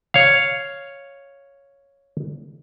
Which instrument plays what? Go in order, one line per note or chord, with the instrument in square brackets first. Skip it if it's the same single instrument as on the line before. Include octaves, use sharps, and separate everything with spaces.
[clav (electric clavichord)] C#5 F5